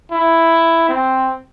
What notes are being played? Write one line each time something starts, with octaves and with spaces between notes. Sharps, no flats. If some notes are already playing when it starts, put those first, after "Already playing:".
E4
C4